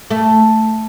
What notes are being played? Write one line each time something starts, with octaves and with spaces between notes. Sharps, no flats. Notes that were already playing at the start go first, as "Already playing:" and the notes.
A3